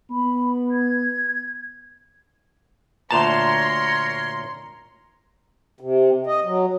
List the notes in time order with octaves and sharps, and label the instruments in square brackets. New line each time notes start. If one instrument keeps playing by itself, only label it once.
[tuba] B3 [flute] B5
[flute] G#6
[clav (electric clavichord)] D2 A#2 A5 [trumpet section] A#4 C#5 [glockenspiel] A#5 F7 [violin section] C6
[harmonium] C3
D#5
F#3